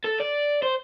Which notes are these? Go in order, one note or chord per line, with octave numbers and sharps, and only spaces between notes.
A4
D5
C5